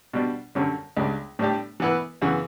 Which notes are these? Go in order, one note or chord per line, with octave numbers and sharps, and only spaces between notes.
B2 G3 D4
F#2 D3 G3 C#4
C#2 C#3 G3 D4
A2 G3 D4 G4
E3 B3 E4 B4
F#2 C#3 E3 B3